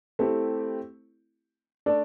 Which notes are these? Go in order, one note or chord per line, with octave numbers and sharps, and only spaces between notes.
A3 C4 E4 G4
A3 D4 A4 D5